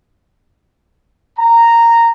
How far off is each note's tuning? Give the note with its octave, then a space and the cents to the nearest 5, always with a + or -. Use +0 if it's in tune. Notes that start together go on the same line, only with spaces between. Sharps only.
A#5 -10